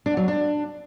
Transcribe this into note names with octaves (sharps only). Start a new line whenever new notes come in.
D4
F#3
D4